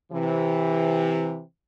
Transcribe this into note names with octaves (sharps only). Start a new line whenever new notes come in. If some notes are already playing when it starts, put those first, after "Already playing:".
C3 E3